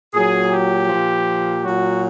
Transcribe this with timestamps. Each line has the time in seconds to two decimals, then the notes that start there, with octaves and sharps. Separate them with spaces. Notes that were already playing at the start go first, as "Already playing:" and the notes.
0.13 A#2 F#3 G#4
0.51 G4
0.88 A#2 F3
1.64 A#2 F#3 F#4